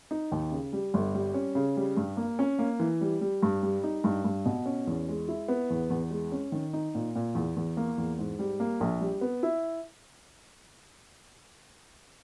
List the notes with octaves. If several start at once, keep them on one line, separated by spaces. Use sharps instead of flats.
D#4
D#2
C#3
G3
G1
G3
C#4
C#3
G3
G2
A#3
C#4
A#3
E3
G3
G3
G2
G3
D#4
G2
G2
B2
C#4
E2
G#3
E4
B3
E2
E2
G#3
C#4
D#3
D#4
A#2
A#2
E2
E2
A#3
E2
G#2
G3
A#3
A#1
G3
B3
E4